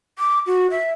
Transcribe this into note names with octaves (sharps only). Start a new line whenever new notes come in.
D6
F#4
E5